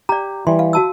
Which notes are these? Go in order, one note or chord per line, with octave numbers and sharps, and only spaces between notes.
G4 D5 A#5
E3 G3 C6
F5
F#4 A5 E6